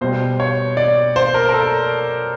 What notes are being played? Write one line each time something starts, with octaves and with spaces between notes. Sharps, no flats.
B2 G3 C5
C#5
D5
C5
A#4
A#4
A4